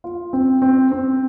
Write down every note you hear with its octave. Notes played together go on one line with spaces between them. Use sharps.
F4
C4
C4
C4